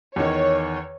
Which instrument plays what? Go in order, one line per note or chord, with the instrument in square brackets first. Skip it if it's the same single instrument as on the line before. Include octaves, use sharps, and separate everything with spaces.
[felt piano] E2 D#3 [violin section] C#5